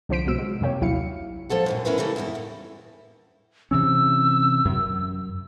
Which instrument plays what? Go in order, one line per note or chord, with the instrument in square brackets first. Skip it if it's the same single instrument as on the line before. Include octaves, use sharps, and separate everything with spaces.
[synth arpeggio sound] C2 D3 F3 C5 B6 D7
C2 G#2 B2 E6 D7
F#3 G#3
F#2 C3 A#3 G4 C#5
A#1 D#2 F#3 E4 F5 C#7
[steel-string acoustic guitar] F3 A#3 A4 F#5
F#2 A#2 D3
C#4 D4 E4 F4 A#4 B4
C#3 E3 G3 A#3 A4
E2 G2 A#2 E4
A2
[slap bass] C3 E3 C#4 [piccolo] E6
[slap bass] F#2